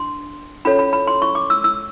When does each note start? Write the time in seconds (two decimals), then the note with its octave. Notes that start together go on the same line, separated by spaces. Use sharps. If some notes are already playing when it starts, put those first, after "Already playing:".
Already playing: D4 C6
0.65 C#4 F4 A4 C#5 B5
0.79 B5
0.93 B5
1.07 C6
1.22 C#6
1.35 D6
1.50 E6
1.64 E6